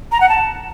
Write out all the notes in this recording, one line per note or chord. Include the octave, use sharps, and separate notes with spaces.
A#5
F#5
A5